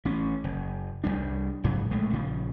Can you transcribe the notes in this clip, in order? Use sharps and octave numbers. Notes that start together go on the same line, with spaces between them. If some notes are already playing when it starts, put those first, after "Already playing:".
A1 C#4
F#1
C2 G2 G3 D4
A#1 G#2 C#3 F#3
A#1 A2 G#3 A3
A#1 C#3 F3